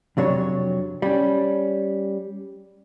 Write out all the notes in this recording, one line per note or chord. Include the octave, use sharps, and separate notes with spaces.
F2 C3 F#3 D4 C#5
G3 C#4